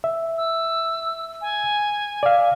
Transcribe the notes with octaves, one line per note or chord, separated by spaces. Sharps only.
E5
E6
G#5
D5 F5